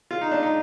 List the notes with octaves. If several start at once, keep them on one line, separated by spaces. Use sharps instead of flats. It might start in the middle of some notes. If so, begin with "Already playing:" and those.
F4
D#4
D4
D#4